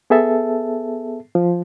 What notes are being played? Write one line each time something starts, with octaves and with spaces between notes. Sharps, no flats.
B3 G#4 A4 E5 A5
F3